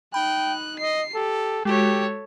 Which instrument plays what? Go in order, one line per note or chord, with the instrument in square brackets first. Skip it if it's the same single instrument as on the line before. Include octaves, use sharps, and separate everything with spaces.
[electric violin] D#4 F#6 [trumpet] G5 [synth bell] B5
[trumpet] D#5 [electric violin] C7
[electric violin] G4 [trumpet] A4
[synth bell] G#3 F#4 [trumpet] G4 [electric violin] A4 C#5